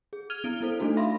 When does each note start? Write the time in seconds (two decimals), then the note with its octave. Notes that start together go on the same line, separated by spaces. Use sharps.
0.13 G#4
0.30 F6 G#6 D#7 F7 G7
0.44 B3 E4 D7 G7
0.61 B3 E4 A4 C5
0.79 A3 D4 D#4 F#4 A4
0.97 E5 F5 B5 C6 A#6